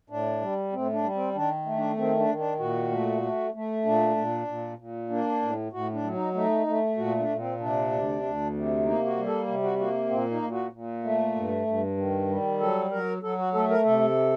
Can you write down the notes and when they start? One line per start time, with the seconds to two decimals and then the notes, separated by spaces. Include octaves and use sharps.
0.10 A2 D4
0.41 G3
0.73 A2 C4
0.93 D4
1.03 G3
1.15 C4
1.35 D#3 D4
1.66 A3
1.77 D4
1.97 D#3 C4
2.19 D4
2.29 D#3
2.39 D4
2.59 A#2 F#4
2.91 A3
3.22 A3
3.54 A3
3.85 A#2 D4
4.16 A#2
4.47 A#2
4.79 A#2
5.10 A#3 D4
5.42 A2
5.72 A2 F#4
5.94 D4
6.03 F#3
6.15 D#4
6.34 A3 D#4
6.67 A3
6.97 A#2 F#4
7.19 D4
7.28 A#2
7.39 C4
7.60 C3 D4
7.91 D2
8.23 D2
8.54 C3
8.85 A#3 D#4
9.06 F#4
9.17 G3
9.27 A4
9.47 C3
9.63 F#4
9.79 A#3 F#4
10.10 A#2 C4
10.31 D#4
10.42 A#2
10.52 F#4
10.73 A#2
11.04 A3
11.35 G2
11.67 G2
11.97 D#3
12.29 G3
12.60 F#3 A4
12.91 F#3 A#4
13.23 F#3 A4
13.38 F#4
13.54 A3 A4
13.70 A#4
13.85 C3 A4